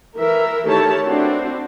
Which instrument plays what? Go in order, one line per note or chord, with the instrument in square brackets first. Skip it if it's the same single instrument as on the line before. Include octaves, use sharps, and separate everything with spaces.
[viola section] E3 A#4 E5
D#3 A3 E4 G4 C#5 A5
C4 D4 E4 F#4 C5